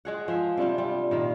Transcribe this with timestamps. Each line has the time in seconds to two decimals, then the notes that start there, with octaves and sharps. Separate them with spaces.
0.05 G#3 G#4 F#5
0.28 F3 G#4 E5
0.57 C3 G3 D4 F4
0.78 G3
1.11 A#2 D#3 A#3